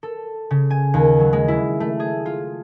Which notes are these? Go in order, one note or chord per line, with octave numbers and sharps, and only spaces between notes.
A4
C#3
G#5
D#2
F#3
G#3
E4
A3
G#4
F4